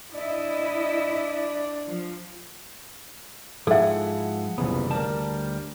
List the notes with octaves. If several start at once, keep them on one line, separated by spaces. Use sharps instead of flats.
D4 E4 D#5
F3
G#2 F3 E4 G#4 A4 E5 F#5
F#1 C2 E3 F3 B3
D2 G3 A#4 D5 A5